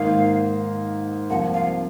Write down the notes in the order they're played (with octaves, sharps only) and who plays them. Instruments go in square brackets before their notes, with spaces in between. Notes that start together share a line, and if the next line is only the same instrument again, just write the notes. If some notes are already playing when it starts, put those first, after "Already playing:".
Already playing: [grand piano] G#2 D#3 A#3 D#4 [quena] F5
[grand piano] C2 C3 F3 A#3 [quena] F#5
[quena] F5